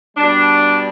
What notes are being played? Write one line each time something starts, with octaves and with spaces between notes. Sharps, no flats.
B2 G3 D4